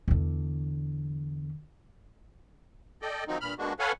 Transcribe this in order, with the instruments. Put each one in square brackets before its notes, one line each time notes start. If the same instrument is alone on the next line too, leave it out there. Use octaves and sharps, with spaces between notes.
[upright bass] E2 D3
[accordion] A4 D5 D#5 G5
D#3 F3 F#3 C4 D#4
G2 A#2 B5 F6
G#3 A#3 B3 D4 F#4
A4 B4 C#5 F5 F#5 G#5